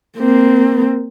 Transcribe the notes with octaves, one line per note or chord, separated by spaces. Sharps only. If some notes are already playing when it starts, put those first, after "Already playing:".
A#3 C4